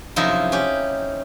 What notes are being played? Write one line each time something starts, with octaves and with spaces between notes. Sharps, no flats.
F#2 C3 F3 D#4 E4
C#4 G4